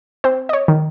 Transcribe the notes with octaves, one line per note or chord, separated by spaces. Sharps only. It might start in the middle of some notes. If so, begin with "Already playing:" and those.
C4 C5
D#5
C#5
D#3